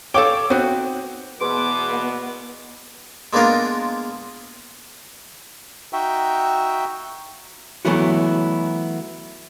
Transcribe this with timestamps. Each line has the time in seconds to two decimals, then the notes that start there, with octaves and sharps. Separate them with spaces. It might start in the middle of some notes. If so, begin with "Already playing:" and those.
0.14 A4 C#5 F5 G5 D6
0.50 B3 C4 D#4 F#4
1.41 E2 B2 B3 G#4 B4 C6 D6
3.33 G#3 A#3 B3 D4 F4 A#4
5.93 D#4 F#4 E5 G5
7.85 E3 F#3 A3 B3 E4 F#4